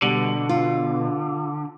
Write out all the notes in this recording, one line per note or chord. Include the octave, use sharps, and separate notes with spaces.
B2 D3 G3
F4